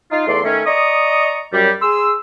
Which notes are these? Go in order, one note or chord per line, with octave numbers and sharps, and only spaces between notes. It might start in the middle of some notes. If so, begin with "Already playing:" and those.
D#4 F4
E2 A3 D5 C6
D#3 A3 C#4
D5 D#5 A#5 C#6 D#6
F#2 G3
G#4 C6 E6